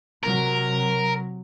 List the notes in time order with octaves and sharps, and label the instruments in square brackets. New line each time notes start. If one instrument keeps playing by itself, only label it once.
[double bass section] C3 F#3 [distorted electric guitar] A#4